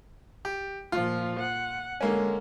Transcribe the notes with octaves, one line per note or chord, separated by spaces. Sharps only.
G4
A#2 F3 F4
F#5
D3 G#3 A#3 C#4